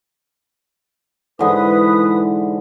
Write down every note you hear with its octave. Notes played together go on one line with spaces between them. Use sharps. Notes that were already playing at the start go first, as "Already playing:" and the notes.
G#2 D3 E3 B4 D#6